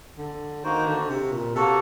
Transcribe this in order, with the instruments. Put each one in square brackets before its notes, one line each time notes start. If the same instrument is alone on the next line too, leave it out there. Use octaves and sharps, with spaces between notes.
[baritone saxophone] D3
[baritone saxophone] D#3 [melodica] A#3 D#4 F#4 C5
[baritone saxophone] D3
C3
A#2
[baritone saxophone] C3 [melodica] A#3 F#4 A4